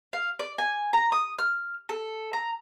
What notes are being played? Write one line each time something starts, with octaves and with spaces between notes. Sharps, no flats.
F5
D5
G#5
A#5
D#6
F6
A4
A#5